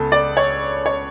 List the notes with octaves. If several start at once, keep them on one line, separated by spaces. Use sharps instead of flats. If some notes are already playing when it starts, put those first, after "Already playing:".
Already playing: C#2 C#3 B3 A4
D5
C#5
C#5